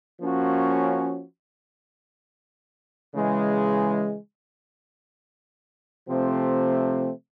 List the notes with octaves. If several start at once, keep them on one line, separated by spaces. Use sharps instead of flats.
F3 A#3 C#4 F#4
C#3 E3 G#3
C3 F3 A3 C4